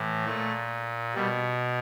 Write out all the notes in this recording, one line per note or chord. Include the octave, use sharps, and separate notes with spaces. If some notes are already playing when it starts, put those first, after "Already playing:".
Already playing: A2 E3
A#2 A3
B2 G3